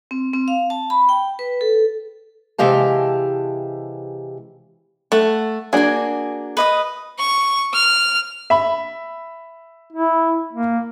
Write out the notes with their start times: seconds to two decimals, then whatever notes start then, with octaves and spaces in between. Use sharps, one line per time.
0.11 C4
0.34 C4
0.48 F5
0.70 A5
0.90 B5
1.09 G5
1.39 B4
1.61 A4
2.58 C3 E3 G#3 G4 F5 A5
5.12 A3 F#5
5.73 A#3 D4 F#4 G#4 G#5
6.57 B4 D#5 D#6
7.19 C#6
7.73 F6
8.50 E5 B5
9.92 E4
10.53 A#3